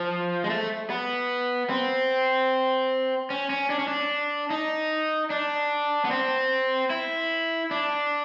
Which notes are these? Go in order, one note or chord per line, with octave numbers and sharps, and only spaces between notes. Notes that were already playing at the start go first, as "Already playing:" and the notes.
Already playing: F3
G#3
A3
B3
C4
C#4
C#4
D4
C#4
D4
D#4
D4
B3
C4
E4
D4